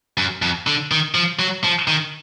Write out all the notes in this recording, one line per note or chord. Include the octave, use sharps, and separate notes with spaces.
F#2
F2
D3
D#3
F3
F#3
F3
D#3